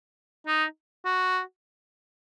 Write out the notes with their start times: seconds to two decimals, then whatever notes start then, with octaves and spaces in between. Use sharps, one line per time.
0.47 D#4
1.05 F#4